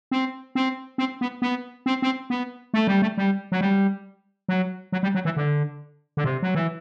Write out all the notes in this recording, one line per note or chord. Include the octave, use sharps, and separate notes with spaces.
C4
C4
C4
B3
B3
C4
C4
B3
A3
G3
A3
G3
F#3
G3
F#3
F#3
G3
F#3
E3
D3
D3
C3
F#3
E3